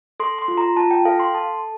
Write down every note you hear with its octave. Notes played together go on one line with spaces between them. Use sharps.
A4 C6
C6
F4
A#5
F4 A5
G5
A4 F5
C6
A4 A5